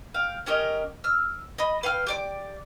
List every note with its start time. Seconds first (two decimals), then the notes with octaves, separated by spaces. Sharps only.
0.14 F5 G5
0.46 C#4 G4 A#4 D#5
1.04 E6 F6
1.58 D#5 B5
1.83 B4 F5 G5 F6
2.07 G4 D5 D6